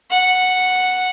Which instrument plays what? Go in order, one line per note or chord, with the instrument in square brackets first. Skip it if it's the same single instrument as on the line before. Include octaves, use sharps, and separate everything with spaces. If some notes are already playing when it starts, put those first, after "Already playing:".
[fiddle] F#5